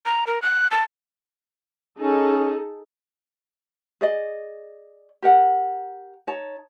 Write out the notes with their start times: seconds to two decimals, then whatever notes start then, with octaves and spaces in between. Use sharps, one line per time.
0.06 A#5
0.27 A#4
0.42 F#6
0.71 A5
2.00 C#4 D#4 G#4 A4
4.01 G#4 D5 D#5
5.22 G4 A#4 F#5
6.27 D#4 C#5 A5